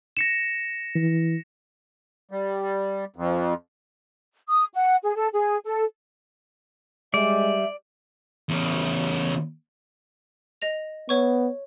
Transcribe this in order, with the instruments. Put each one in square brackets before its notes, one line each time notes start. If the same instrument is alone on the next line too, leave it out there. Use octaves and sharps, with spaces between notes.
[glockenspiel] A#6 C#7 E7
[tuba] E3
[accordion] G3
F2
[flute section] D#6
F#5
G#4
A4
G#4
A4
[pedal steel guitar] G3 [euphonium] G#3 [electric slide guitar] D5 [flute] E5
[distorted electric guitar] E2 C#3
[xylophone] D#5 A#6 F7
[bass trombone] B3 [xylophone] C#5 C#6